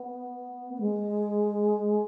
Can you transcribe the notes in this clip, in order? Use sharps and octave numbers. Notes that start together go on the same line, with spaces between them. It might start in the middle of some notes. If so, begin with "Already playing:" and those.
Already playing: B3
B3
G#3